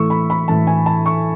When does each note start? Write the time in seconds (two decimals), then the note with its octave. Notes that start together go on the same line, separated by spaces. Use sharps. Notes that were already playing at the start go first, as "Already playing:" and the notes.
Already playing: A2 E3 A3 C#6 E6
0.10 B5
0.30 B5
0.48 A2 E3 A3 A5
0.67 G#5
0.86 A5
1.06 C#6